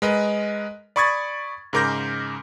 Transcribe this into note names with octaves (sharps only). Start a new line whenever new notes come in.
G#3 A#4 B4 D#5
D5 B5 C#6 D#6 G#6 A6
G#2 C#3 A#4 D6 G6 A#6